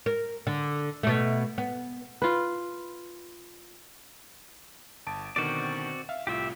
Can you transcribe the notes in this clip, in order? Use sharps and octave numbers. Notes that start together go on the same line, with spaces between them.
A#4
D3
B2 A3
B3
F4 B4
G1 A5 D7
B2 D3 D#3 C4 F#4 D5
E5 F5 F6
C2 A2 F4 G4 E5